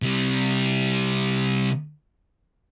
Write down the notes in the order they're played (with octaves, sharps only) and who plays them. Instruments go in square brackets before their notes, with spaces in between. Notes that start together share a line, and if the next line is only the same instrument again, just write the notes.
[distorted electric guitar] C3 G3